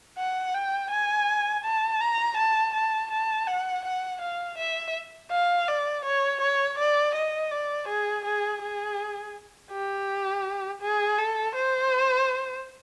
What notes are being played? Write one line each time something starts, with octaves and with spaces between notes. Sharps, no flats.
F#5
G5
G#5
A5
A#5
A5
A5
A5
F#5
F#5
F5
E5
F5
D5
C#5
C#5
D5
D#5
D5
G#4
G#4
G#4
G4
G#4
A4
C5